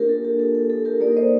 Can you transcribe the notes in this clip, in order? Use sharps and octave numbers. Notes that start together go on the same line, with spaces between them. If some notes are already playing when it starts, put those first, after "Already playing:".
Already playing: A#3 D4 F4 G4 A#4
A4
G4
A4
A4
A4
G4 A#4
A#3 A#4 D5
D#4
C5 D#5